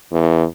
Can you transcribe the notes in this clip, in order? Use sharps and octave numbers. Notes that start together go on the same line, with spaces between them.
E2